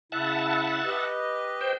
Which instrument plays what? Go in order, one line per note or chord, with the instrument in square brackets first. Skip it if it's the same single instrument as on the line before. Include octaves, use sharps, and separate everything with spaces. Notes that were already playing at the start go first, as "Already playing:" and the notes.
[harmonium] C#3 E4 [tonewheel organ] E5 F#5 A5
[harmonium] G4 B4 D#5
[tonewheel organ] C5 G5